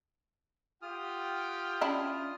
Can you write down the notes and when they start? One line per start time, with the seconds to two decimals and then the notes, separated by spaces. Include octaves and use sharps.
0.82 F4 G4 F#5 G5 D#6 F6
1.81 C#4 D4 E4